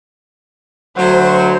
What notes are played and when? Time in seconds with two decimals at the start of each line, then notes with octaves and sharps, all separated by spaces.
0.97 D2 F#3 C5